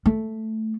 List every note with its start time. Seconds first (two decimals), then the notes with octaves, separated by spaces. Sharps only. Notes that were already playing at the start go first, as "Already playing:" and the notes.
0.06 A3